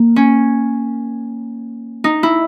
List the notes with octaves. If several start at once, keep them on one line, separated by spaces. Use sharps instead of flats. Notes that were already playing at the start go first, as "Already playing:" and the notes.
Already playing: A#3
C#4
D#4
E4